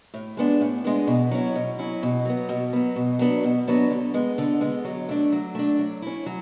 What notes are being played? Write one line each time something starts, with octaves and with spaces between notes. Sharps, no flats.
A2
G#3 B3 D4
A2
G#3 B3 D4
B2
F#3 C#4 E4
B2
F#3 C#4 E4
B2
F#3 B3
B2
F#3 B3
B2
F#3 B3 D4
B2
F#3 B3 D4
D3
G#3 B3
D3
G#3 B3
F#3
A3 D4
F#3
A3 D4
F#3
C#4 E4
F#3